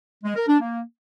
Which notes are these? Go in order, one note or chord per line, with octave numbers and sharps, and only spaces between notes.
G#3
A#4
D4
A#3